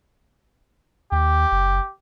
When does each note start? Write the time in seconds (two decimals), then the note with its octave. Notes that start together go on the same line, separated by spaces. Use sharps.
1.12 D#2 G4
1.52 F#1